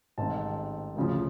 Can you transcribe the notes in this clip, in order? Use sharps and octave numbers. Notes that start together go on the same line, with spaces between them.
A1 G#2 D#3 G#3 C4 A5
D2 C#3 F3